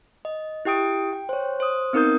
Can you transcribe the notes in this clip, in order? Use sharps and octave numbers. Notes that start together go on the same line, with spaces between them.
D#5
E4 G4 G5 D#6 D7
G5
C5 C#5
C5 D#6
B3 C4 D#4 A#4 D#6 G6